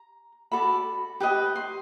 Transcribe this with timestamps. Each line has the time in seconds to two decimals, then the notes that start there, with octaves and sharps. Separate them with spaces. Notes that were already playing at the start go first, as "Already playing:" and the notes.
Already playing: A#5
0.52 F#4 A4 D5 B5
1.20 G4 B4 D#5
1.56 C6